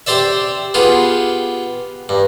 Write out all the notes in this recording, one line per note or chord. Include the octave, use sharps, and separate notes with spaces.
C4 G4 C5 D5 E5
B3 F4 G4 G#4
G2